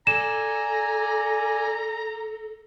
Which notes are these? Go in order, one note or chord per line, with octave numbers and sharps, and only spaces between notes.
A4 D5 G#5 A#5 E7